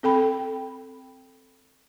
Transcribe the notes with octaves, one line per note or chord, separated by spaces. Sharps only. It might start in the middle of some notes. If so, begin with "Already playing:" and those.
C4 A4 G5 B5